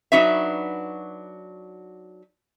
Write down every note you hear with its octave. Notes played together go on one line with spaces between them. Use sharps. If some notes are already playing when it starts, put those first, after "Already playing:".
F#3 D4 D#4 F#4 B4 E5